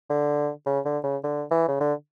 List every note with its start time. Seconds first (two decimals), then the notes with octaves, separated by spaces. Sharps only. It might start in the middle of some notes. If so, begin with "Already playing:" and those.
0.10 D3
0.66 C#3
0.85 D3
1.04 C#3
1.24 D3
1.51 E3
1.68 C#3
1.80 D3